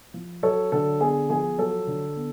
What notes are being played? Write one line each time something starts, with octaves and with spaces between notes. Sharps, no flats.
F3
F#3 A4 C#5
D3 A4
B3 G#4
F3 G#4
F#3 A4
D3
B3